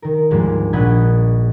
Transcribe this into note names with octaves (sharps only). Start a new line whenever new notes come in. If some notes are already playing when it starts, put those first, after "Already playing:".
D#3 A#4
D2 G#2 F3 G3 G#3 A#3
A#1 D#5 F#5 B5 G6 G#6